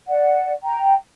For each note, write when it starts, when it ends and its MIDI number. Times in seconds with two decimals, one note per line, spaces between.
0.08 0.52 74
0.08 0.52 78
0.63 0.94 79
0.63 0.94 82